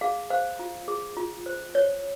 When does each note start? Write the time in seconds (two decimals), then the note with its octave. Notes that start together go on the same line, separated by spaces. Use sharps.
0.01 G#4 F5
0.30 C5 F5
0.59 F4
0.88 G#4
1.17 F4
1.46 C5
1.75 C5 C#5